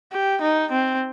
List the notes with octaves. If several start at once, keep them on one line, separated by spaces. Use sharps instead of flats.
G4
D#4
C4